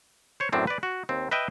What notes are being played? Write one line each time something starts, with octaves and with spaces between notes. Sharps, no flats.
C5 C#5
F#2 A2 C4 D4
B4 D5
F#4
D#2 C4
B4 D#5 E5 G5